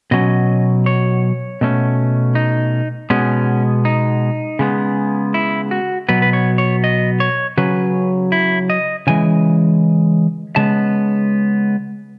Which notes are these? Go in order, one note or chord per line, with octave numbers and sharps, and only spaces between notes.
B2 F#3 C#4 D#5
C#5
B2 A3 C#4
D#4
B2 G#3 B3 C#4
D#4
C#3 G#3 B3
E4
F#4
B2 F#3 B3 B4
B4
C#5
C#5
D#5
C#5
C#3 F#3 C#4 B4
E4
D#5
C#3 E3 G#3 G#5
C#3 G#3 B3 A5